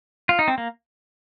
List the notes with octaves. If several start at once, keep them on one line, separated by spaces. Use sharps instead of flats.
F4
D#4
C4
A#3